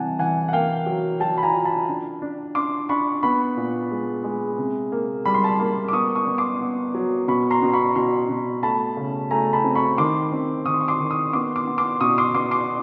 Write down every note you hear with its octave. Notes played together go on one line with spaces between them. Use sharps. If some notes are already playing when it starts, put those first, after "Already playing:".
Already playing: C3 E3 G3 F#5 G#5 A5
E3 F#5 G#5
F#5
A#3 F5 G5
F#3
F#3 G5 A5
B5
G#5 A#5
F4
A5 B5
D4
D4
D4 C6 D6
D4 B5 C#6
B3 B5 C#6
A#2
G#3
G#3
C3
A#3
G3 B5
C6
A5 B5
A#3
D6
B3 C#6 D#6
C#6 D#6
B3
C6 D6
B3
F#3
B2 B5 C#6
A#5 C6
B2
B5 C#6
B2 A#5 C6
B2
A3 A5 B5
C#3
A3 G#5 A#5
A5 B5
C4
B5 C#6
D#3 C6 D6
C4
D#3 C#6 D#6
C6
C#6
C6 D6
D#3
C#6 D#6
B3 C6 D6
C6 D6
B3
C6 D6
B2 C#6 D#6
C6 D6
B3 C6 D6
C6 D6